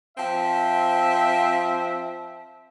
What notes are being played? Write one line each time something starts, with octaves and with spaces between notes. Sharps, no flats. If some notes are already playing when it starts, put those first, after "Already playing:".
F3 C4 E5